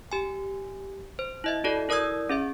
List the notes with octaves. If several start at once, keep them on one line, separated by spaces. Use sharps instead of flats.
G4 G#5
C5
E4 D#5 E5
E4 F#4 A4 D5
E4 A#4 D5 D#6 E6 G#6
C#4 G#4 E5